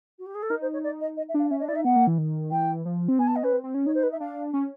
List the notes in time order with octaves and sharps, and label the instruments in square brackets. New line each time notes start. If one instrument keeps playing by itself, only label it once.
[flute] F#4
G4
G#4
A4
[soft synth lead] D#4 [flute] A#4
[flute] C5
C#5
D5
D#5
D#5
E5
[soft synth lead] D4 [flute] F5
[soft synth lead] C#4 [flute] E5
[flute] D#5
[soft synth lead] D4
[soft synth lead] E4 [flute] D5
[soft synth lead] D#4 [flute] E5
[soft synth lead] B3 [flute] F#5
[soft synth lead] A#3
E3
D#3
[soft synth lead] E3 [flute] G5
[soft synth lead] F3
C4
[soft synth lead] B3 [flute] G#5
[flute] A5
D#5
[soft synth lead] C#4 [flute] B4
[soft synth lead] C4
C4
C#4
[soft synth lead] D#4 [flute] C#5
[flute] C5
B4
E5
[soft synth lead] D4 [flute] F5
[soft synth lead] C#4